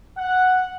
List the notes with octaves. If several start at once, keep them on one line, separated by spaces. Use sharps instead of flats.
F#5